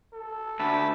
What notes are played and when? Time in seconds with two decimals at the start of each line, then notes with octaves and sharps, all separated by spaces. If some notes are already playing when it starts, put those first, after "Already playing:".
0.13 A4
0.59 D2 E5 A5 B5